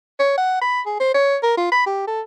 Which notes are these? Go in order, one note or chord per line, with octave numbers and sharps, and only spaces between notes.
C#5
F#5
B5
G#4
C5
C#5
A#4
F4
B5
G4
A4